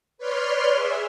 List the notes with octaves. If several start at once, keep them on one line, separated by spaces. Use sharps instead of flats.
B4 C#5 D5 C6 F6
G#4 E5